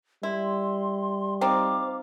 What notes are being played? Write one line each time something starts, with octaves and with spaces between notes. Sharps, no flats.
G3 E4 C6
C4 D#4 F4 C5 D6